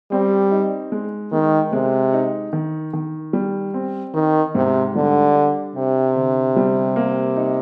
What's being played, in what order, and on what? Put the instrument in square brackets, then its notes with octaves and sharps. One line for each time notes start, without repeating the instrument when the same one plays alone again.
[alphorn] G3 [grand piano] C4
[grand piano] D#4
G#3
[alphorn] D#3 [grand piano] G#3
[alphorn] C3 [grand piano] G#3
[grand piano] D#4
D#3
D#3
G3
C4
[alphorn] D#3 [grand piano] D#4
[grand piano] G#2 [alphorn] C3
[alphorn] D3 [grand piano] G3
[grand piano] D4
[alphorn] C3 [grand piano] G4
[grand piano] D3
G3
A#3
D#4